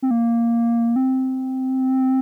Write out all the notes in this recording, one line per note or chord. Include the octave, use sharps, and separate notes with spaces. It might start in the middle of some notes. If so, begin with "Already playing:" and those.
C4
A#3
C4